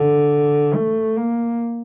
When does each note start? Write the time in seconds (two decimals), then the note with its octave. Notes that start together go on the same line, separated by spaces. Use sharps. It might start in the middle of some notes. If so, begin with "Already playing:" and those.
Already playing: D3
0.75 A3
1.17 A#3